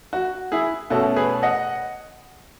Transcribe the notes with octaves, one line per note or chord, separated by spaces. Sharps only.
F#4
E4 G#4
B2 A3 C#4 F#4 A4
G#4 B4
D#5 F#5